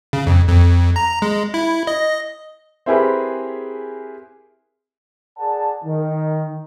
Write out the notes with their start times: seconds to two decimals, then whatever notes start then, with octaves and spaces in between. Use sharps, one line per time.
0.13 C#3
0.27 F2
0.49 F2
0.96 A#5
1.22 G#3
1.54 E4
1.87 D#5
2.86 C4 E4 G4 G#4 A#4 B4
5.39 G#4 A#4 D5 F#5 A5
5.84 D#3